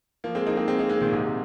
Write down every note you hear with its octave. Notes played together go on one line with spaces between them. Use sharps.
F3 A#3
G#3 C4
A#3 D#4
G#3 C4
G#3 C4
A#3 D#4
G#3 C4
A#2 D#3
G#2 C3